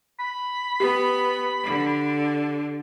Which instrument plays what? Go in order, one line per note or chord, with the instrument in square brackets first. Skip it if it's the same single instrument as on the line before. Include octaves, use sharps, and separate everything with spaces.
[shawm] B5
[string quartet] B3 [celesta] G4
[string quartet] D3